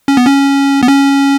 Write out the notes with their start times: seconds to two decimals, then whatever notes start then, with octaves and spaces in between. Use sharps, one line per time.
0.08 C#4
0.17 B3
0.26 C#4
0.83 B3
0.88 C#4